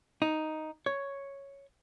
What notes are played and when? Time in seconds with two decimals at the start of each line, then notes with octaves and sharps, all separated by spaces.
0.22 D#4
0.86 C#5